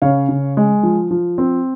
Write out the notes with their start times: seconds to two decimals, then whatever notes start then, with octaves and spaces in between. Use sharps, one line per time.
0.02 C#3 C#5 F5
0.29 C#3
0.57 G#3
0.83 F3
1.11 F3
1.38 C4